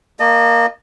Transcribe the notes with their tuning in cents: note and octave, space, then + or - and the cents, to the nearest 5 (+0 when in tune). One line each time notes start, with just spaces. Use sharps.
A#3 +0 D#5 -30 A5 +0